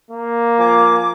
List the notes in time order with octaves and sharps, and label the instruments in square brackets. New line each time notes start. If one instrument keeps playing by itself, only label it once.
[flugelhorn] A#3
[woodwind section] F3 G#5 D6